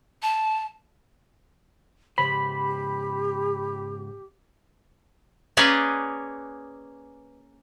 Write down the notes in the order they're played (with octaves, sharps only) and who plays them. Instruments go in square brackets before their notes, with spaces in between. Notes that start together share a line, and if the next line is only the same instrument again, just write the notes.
[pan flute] A5
[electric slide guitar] G#2 C#3 C5 [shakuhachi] G4 [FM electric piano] B5
[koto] A#3 C#4 G#4 B4 D5 D#5